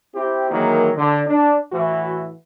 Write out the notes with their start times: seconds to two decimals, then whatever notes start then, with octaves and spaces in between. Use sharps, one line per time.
0.15 C4 E4 G4
0.51 D#3 E3 F#3 G#3 A#3
0.97 D3
1.27 D4
1.72 A2 E3 E4 F#4